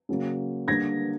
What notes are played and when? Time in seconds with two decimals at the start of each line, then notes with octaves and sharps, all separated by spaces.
0.09 C#3 F#3 A#3
0.68 D3 G3 A#3 G#6 A#6